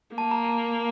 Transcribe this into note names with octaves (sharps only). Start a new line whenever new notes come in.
A#3 A5
A#5
A5